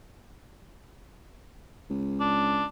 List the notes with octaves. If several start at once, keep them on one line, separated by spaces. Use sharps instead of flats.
C#2
D4